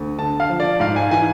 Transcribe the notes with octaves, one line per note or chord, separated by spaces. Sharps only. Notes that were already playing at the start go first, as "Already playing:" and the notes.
Already playing: D2
D3 A5
F5
F3
D5
G#2 F5
G#5
E3 G#5